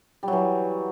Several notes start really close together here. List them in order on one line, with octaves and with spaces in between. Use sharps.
G3 F#3 E3